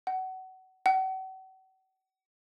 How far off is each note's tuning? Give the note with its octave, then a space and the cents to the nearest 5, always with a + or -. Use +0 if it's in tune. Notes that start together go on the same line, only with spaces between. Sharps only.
F#5 +25
F#5 +40